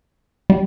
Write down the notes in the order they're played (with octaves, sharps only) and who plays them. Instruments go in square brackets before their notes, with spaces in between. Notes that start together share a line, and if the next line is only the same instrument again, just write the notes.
[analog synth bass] G3